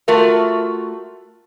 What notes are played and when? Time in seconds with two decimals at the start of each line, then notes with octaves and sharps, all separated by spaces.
0.08 A3 F4 F#4 A#4 E5